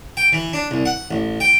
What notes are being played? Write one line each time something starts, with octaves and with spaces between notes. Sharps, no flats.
G5
E3
D4
C2
F#5
A1
G5